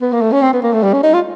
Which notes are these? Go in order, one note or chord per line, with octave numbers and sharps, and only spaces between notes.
B3
A#3
A3
C#4
C4
B3
A#3
A3
G3
C#4
D#4
F4